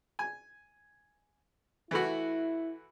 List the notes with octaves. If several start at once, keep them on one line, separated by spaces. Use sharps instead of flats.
G#5
E3 A3 E4 F#4